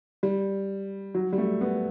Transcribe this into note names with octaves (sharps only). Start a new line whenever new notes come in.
G3
F#3
G3
A3
B3